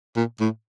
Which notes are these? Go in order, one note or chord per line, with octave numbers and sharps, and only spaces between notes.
A#2
A2